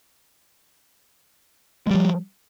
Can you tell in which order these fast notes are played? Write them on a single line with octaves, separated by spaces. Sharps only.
G#3 G3 F3